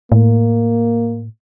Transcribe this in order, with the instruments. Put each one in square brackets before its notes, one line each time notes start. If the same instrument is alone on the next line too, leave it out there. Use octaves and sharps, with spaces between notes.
[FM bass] A2 [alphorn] A#3